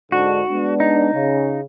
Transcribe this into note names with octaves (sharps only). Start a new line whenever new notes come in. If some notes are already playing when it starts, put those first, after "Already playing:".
G#2 D3 F#4
G#3 B3 D4
D#4
C#3